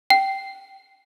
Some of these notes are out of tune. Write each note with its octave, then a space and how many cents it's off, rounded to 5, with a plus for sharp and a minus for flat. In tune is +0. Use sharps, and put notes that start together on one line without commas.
G5 -15